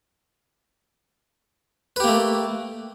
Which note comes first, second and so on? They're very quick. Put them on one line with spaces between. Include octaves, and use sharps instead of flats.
B4 G4 A#3 A3